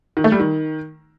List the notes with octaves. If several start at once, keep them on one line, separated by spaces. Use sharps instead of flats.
D#3
A3
G3
D#3